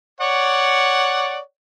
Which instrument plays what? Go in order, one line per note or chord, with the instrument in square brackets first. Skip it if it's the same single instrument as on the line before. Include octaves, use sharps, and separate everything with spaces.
[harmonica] C#5 D5 F#5